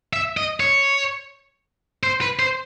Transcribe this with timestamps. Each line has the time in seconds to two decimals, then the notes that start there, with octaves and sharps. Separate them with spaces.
0.13 E5
0.37 D#5
0.60 C#5
2.03 C5
2.21 B4
2.39 C5